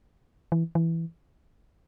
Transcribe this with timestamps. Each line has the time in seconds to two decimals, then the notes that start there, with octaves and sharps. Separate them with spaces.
0.52 E3
0.75 E3